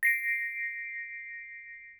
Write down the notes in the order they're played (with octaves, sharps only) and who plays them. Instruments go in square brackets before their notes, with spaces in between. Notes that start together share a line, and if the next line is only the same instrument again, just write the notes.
[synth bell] A#6 C7 D7